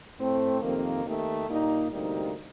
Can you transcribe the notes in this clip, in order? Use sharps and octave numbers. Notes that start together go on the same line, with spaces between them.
A2 A3 C4
F2 C3 D#3 A#3
D#2 D#3 A3
A#2 G3 A#3 D#4
D2 C3 G3 A#3 D#4